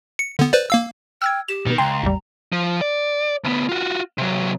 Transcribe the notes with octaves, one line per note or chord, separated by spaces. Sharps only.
C#7
D3 B3
B4 C5 D5
A#3 F5 E6
G5 E6 F6 G#6
G4 E7
B2 D#3 B3
C#2 G5 A#5 C6
A1 E2 G3
F3
D5
D2 B3
F4 F#4
C3 F#3